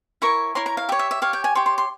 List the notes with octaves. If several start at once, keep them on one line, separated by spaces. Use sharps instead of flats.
E4 A#4 C#5 C#6
E4 A#4 C#5 C6
A#5
F5
G4 C#5 E5
E5
E5
G4 C#5 F5
G5
G#5
G4 C#5 C6
C6
C6